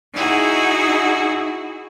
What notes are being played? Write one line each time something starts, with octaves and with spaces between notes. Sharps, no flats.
D#4 E4 F#4 G#4